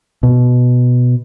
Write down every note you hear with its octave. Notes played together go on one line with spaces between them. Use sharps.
B2